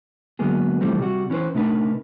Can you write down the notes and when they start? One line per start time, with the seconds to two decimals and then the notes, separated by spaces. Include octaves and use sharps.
0.39 D3 F#3 G#3 A#3 B3 G#4
0.81 C3 E3 F3 G3 A3 C4
0.99 C3 G3 F#4
1.30 E3 C#4 D#4 B4 C5
1.55 C3 A3 D4 D#4 A#4 B4